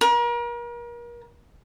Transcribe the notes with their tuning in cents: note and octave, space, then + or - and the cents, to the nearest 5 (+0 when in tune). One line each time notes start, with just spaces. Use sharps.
A#4 +35